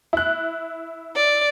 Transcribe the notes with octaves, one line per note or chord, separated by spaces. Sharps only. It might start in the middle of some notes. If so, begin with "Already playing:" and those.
E4 F#6
D5